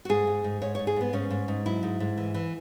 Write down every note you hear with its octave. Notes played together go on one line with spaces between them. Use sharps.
F#4
G#2 G#4
G#2
G#2
G#2 C#5
G#2 C#5
G#4
G#2 B3
G#2 C#4
G#2
G#2
F#3 E4
G#2
G#2
E3
E3